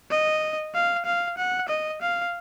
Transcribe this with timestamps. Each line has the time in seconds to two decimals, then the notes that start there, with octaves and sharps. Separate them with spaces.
0.11 D#5
0.75 F5
1.06 F5
1.38 F#5
1.69 D#5
2.02 F5